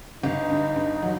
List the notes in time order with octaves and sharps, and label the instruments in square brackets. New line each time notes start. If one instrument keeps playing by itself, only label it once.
[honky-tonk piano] G1 [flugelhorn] D#4
[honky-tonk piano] G2
G2
F#3